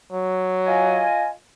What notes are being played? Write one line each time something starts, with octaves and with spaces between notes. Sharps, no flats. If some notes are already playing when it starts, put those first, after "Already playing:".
F#3
F4 D#5 G#5